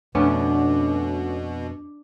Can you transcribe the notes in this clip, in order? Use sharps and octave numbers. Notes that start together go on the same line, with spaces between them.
F2 B2 A3 B3 C#4 D4